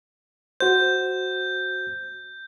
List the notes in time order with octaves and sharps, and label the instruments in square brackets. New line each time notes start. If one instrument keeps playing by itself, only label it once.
[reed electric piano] F#4 C5 [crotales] G6